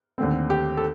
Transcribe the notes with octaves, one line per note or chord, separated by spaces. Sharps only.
D#2 D3 A3 C4
G4
A4